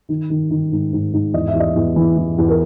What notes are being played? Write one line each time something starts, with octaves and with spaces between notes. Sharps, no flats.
D#3
D#3
D#3
G#2
G#2
G#2
E2 D#5
E5
E2
D#5
E2
E3
E3
E2
A#4